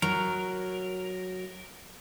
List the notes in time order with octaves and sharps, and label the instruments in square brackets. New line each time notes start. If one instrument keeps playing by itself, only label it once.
[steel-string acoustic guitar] F#3 [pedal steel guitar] A#4